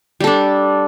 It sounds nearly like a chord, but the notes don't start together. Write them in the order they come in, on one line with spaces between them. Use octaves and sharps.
G3 A4 D4